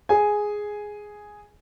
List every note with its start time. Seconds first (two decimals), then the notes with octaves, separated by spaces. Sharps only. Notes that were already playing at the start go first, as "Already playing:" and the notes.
0.09 G#4 G#5